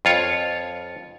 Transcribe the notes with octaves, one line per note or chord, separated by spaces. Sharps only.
F2 F4 C#5